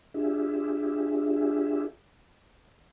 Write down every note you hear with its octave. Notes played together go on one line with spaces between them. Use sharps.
D4 F4 G4 G#4 E5